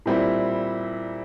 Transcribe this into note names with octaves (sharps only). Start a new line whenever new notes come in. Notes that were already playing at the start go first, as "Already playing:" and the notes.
A#2 G3 C4 E4